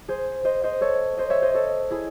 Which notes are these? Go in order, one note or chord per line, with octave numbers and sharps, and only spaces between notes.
G#4 C5
C5 D#5
C5 D#5
A4 C#5
C5 D#5
C#5 E5
C5 D#5
A4 C#5
E4 G#4